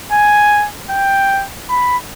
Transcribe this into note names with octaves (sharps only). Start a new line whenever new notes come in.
G#5
G5
B5